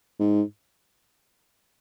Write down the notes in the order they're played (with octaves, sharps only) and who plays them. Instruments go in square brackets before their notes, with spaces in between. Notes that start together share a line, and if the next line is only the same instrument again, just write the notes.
[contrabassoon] G#2